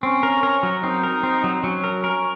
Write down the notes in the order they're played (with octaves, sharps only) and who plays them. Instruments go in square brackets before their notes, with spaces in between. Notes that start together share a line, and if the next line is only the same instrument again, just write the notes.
[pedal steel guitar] C4 [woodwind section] C#4
[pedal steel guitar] A#4
A#4
F#3
[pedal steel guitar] C4 [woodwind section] D#4
[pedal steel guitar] A#4
C4
F#3
[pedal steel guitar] F#3 [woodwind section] C#4
[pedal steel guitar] A#4
A#4